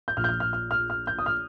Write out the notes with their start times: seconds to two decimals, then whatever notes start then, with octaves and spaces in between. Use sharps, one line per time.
0.08 G6
0.16 A#1 A#2 F6
0.24 G6
0.29 F6
0.40 F6
0.53 F6
0.71 F6
0.90 F6
1.07 G6
1.19 D#6
1.26 F6